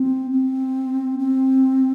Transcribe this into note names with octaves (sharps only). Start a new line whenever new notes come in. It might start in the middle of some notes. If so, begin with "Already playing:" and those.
Already playing: C4
C4
C4